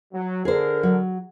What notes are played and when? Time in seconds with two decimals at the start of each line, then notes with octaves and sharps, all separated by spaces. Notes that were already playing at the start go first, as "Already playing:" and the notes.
0.13 F#3
0.45 D3 G#4 A#4 C5
0.83 F#3